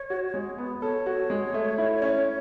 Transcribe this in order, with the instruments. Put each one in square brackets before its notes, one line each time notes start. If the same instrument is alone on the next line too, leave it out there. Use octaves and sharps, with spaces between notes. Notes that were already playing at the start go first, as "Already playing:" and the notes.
Already playing: [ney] C#5
[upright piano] F#4
G#3
B3
[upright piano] A4 [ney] C#5
[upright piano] F#4
G#3
A3
E4
C#4